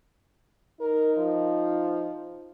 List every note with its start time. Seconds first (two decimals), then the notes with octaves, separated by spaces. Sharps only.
0.80 D#4 A#4
1.18 F3